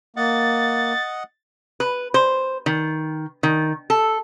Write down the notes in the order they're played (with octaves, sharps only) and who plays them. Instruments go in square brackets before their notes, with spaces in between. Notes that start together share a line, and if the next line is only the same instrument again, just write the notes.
[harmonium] A#3 [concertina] D#5 F#5 [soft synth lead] A6
[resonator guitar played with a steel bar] B4
C5
D#3
D#3
A4